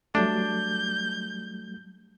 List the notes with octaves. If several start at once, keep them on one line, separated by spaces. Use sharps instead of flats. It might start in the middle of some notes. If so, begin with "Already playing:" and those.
F#3 G3 A3 D4 G6